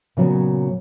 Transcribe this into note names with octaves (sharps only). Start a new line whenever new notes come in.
A#2 C#3 F#3 B3